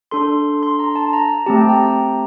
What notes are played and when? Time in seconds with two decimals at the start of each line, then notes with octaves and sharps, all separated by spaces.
0.11 D4 A4 C6
0.63 C6
0.79 A#5
0.96 A5
1.13 A#5
1.29 A#5
1.46 A3 C4 G4 A5
1.57 G5
1.69 A#5